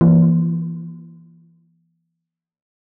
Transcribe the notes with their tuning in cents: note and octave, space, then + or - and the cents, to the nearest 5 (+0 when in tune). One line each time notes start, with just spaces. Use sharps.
E3 +25 A#3 +25